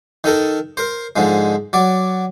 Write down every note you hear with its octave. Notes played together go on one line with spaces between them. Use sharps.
D#3 D#4 A4 A#4
A#4 C5
G#2 D3 F3 G#3
F#3 D5